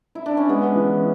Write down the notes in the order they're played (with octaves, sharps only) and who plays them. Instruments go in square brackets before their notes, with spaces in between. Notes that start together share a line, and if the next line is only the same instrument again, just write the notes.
[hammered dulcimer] E4
D4
C#4
[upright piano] G#3 [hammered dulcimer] B3
[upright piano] E3